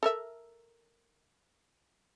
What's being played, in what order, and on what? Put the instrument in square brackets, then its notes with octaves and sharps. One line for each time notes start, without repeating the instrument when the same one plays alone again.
[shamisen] A4 A#4 E5